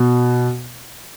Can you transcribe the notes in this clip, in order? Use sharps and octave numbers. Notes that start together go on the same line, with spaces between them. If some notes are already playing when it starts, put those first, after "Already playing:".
Already playing: B2